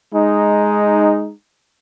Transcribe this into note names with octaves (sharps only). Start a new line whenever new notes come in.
G#3 D#4